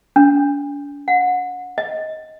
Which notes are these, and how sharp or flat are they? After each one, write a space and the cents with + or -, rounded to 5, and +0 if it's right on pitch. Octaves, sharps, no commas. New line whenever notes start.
D4 -45
F#5 -25
D#5 +15